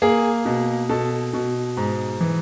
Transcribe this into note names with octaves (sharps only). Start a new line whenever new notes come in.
A#3 G#4
B2
B2 A4
B2
G#2
E3